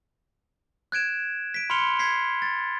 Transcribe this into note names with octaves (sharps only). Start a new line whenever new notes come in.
F#6 G#6 D7 E7
B6 D7
B5 C6 F6 C#7 F7 G7
G#6 B6 C7
A6